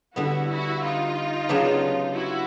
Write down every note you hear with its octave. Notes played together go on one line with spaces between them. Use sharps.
D3 G3 B3 E4 F#4
E4 F#4
D#4 F4
C#3 F#3 B3 D4 G4
E4 F#4